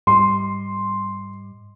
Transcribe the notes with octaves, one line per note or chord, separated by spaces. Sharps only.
G#2 G3 C6